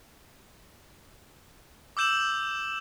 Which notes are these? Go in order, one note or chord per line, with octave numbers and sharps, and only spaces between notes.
D6 E6 G6 E7 F#7